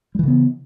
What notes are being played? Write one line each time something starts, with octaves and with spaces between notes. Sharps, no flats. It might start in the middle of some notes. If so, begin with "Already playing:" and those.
C#3 E3 G3 B3